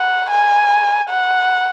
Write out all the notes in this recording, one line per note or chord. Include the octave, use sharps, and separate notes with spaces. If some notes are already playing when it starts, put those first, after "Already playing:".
Already playing: F#5
G#5
F#5